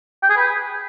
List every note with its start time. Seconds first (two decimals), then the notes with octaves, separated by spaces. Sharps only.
0.22 G5
0.30 G#4
0.37 B4